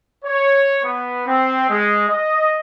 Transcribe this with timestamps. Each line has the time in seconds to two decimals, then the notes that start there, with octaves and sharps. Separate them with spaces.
0.25 C#5
0.83 B3
1.26 C4
1.70 G#3
2.09 D#5